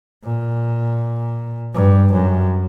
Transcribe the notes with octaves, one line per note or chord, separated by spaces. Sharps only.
A#2
G2
F#2